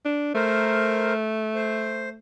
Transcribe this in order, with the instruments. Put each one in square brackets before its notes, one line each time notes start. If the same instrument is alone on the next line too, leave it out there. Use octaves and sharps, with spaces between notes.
[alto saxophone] D4
[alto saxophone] A3 [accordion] A#4 C5
[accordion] C5